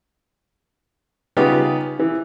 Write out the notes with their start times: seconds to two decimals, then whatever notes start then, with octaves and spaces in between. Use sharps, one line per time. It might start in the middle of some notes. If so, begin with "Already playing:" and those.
1.37 C#3 B3 D#4 F4 G4
1.99 E3